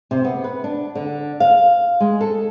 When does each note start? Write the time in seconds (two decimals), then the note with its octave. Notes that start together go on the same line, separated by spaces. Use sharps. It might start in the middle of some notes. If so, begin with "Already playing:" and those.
0.11 C3
0.24 B3
0.44 B4
0.64 D4
0.95 D3
1.40 F5
2.00 G#3
2.21 A4